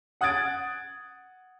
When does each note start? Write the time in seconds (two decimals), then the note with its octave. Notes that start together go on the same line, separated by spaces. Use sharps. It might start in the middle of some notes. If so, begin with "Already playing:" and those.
0.21 F#5 D#6 F#6 G#6 A6 D7